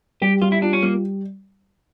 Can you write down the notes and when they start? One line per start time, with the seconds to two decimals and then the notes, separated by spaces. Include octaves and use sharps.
0.22 G3 G4
0.42 G3 F4
0.52 E4
0.62 D4 F4
0.73 C#4
0.83 G3 A#3